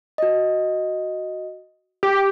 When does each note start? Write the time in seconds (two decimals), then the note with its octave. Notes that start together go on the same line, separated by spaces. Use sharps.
0.18 F#4 D#5
2.03 G4